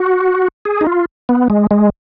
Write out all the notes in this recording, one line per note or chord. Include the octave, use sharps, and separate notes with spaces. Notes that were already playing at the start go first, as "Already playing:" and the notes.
Already playing: F#4
G#4
D#4
F4
B3
G#3
G#3